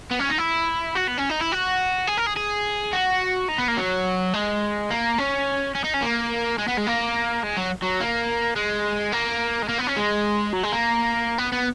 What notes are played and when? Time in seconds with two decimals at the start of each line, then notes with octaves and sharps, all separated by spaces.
0.11 B3
0.20 C#4
0.30 D#4
0.38 E4
0.95 F#4
1.07 B3
1.18 C#4
1.29 D#4
1.41 E4
1.52 F#4
2.07 G#4
2.18 A#4
2.27 G#4
2.37 G#4
2.93 F#4
3.49 D#4
3.58 B3
3.68 A#3
3.77 F#3
4.33 G#3
4.90 A#3
5.18 C#4
5.75 C#4
5.84 D#4
5.94 C#4
6.02 A#3
6.59 G#3
6.68 B3
6.78 G#3
6.87 A#3
7.44 G#3
7.57 F#3
7.83 F#3
8.01 A#3
8.56 G#3
9.13 A#3
9.63 G#3
9.69 A#3
9.79 B3
9.87 C#4
9.97 G#3
10.53 F#3
10.63 G#3
10.72 A#3
11.38 B3
11.53 B3